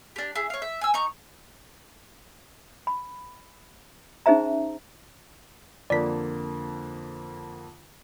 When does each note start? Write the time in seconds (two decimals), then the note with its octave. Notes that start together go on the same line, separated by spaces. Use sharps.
0.16 D4 G4
0.35 E4 G#4
0.50 C#5 F5
0.62 E5
0.81 G#5 E6
0.94 D#4 A#5 C#6
2.87 B5
4.26 C#4 D#4 G#4 C5 E5 A#5
5.90 F2 D3 A#3 D5 B6